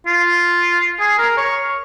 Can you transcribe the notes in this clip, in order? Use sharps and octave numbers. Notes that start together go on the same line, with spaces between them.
F4
G#4
A#4
C#5